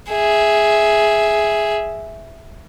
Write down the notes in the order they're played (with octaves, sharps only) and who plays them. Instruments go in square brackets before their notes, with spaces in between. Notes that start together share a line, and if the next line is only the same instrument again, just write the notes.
[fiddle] G#4 E5